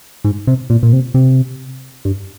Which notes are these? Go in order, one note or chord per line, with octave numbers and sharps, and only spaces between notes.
G#2
C3
A#2
A#2
C3
C3
G2